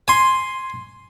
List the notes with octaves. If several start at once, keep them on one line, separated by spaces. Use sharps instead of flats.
G#5 C6